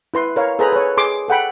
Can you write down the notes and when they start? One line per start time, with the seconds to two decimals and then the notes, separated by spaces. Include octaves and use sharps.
0.14 E4 B4 C6
0.36 A#4 C#5 F5
0.59 G#4 A4 B4 C5 A#5 B5
0.72 B4 C#5
0.97 G#4 C6 D6
1.28 A4 F#5 G5 B5